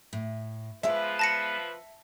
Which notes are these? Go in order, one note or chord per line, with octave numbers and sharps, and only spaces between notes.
A2
F3 G#3 B3 B4 D5 E5
A5 A#6 C#7